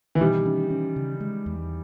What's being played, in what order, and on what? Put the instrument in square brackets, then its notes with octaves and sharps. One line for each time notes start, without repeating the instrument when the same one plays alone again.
[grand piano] E3
[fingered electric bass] B2 [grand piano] D#3 G3
[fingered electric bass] C#4
C#4
C#3
G#3
E2